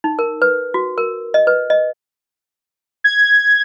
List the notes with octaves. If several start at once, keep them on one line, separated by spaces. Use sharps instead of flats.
D#4
A#4
B4
F#4
A#4
D#5
B4
D#5
G#6